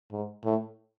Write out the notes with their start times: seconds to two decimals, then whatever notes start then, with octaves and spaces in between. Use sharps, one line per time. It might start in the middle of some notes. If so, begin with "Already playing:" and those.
0.12 G#2
0.44 A2